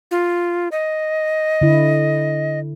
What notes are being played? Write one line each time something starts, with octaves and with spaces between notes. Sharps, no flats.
F4
D#5
D3 E4